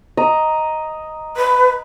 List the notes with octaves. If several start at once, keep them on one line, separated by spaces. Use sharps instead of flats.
D#5 A#5
B4